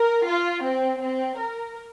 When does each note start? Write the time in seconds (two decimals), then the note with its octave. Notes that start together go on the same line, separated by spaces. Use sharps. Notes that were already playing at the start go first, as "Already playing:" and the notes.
Already playing: A#4
0.25 F4
0.63 C4
1.00 C4
1.37 A#4